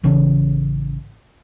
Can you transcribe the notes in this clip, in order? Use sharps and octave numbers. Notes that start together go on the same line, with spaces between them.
A1 C#3 E3 C#4